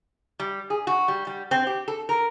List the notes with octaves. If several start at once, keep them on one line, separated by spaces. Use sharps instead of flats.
G3
G#4
F#4
G3
G3
C4
G4
A4
A#4